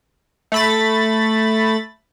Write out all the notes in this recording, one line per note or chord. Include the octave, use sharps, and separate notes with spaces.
A3 B5 A6